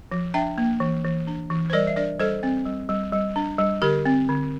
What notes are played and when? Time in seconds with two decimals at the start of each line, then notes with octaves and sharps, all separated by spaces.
0.12 F3
0.34 D4 E5 G5
0.58 A#3
0.80 E3
1.04 E3
1.27 D4
1.50 E3
1.70 C5
1.73 G3 A#4 D5
1.87 E5
1.96 D4 A#4 D5
2.20 G3 A4 C5
2.43 C4
2.66 G3
2.89 G3
3.12 G3
3.36 D4
3.59 G3
3.82 D3 G4 A#4
4.05 C4
4.29 D3